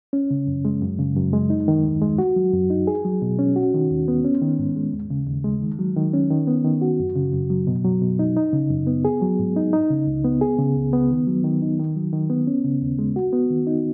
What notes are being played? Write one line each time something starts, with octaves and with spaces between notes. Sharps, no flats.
C#4
C#3
F#2
G#3
F#2
C#3
F#2
G#3
D#4
D#3
D#2
G#3
F#4
F#3
F#2
D#4
G#4
F#3
B2
C#4
F#4
D#3
D#2
B3
C#4
D#3
G#2
G#3
D#2
C#3
D#2
G#3
D#3
F#3
D#3
C#4
D#3
B3
D#3
F#4
F#2
C#3
F#2
F#3
B2
F#3
B2
D#4
D#4
C#3
F#2
B3
G#4
F#3
G#2
D#4
D#4
C#3
C#2
B3
G#4
C#3
C#2
B3
D#3
F#3
D#3
D#4
D#3
F#3
D#3
B3
C#4
C#3
D#2
G#3
F#4
B3
D#3
D#4